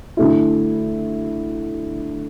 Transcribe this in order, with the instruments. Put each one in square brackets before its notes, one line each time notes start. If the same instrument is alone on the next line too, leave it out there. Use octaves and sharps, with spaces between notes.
[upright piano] D3 A3 E4